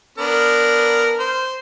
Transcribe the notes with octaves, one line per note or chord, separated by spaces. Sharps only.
B3 D4 A#4
C5